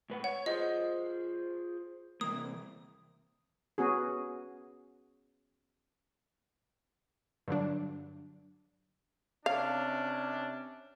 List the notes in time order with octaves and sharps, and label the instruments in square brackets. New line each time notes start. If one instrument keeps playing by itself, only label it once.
[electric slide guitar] A2 B4 F#5
[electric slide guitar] C#5 [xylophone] F#5
[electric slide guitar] F4 G#4 C5 [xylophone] D#5
[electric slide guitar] C3 E3 A#3 [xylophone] D#6
[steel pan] B3 C#4 F#4 G#4
[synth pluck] G2 D3 F#3 D4
[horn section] C3 C#4 D4 [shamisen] F5